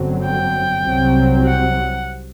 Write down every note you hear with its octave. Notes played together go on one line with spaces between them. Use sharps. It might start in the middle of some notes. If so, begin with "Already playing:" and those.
Already playing: G1 F#2 D3 F#3 C4
G5
C2 C3 F#3 C4
F#5